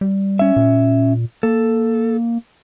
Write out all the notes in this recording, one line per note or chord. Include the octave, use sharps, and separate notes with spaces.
G3
C#4 E5
A#2
A#3 A4